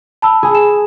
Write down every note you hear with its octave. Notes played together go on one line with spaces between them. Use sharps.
A5 B5 E6
G#4 G#5
E7